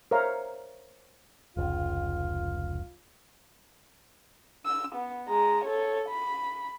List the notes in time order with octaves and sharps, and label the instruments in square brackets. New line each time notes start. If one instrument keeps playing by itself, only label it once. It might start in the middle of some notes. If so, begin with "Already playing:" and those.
[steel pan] A#4 C5 C#5 E5 F5 A#5
[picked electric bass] F1 C#2 [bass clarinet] F4
[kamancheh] E6
B3
G#3 A#5
A4 C#5
B5